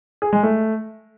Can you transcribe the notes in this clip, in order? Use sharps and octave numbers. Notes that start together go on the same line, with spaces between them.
G#4
G#3
A3